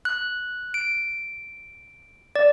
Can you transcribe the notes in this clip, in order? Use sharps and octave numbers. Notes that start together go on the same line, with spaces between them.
F#6
D7
D5